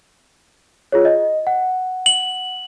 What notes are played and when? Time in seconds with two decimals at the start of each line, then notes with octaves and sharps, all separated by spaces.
0.92 F4 G#4 C#5
1.05 D#5
1.47 F#5
2.06 F#7